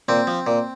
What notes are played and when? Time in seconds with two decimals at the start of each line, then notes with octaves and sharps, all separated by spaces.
0.09 A#2 C4
0.27 F3
0.47 A#2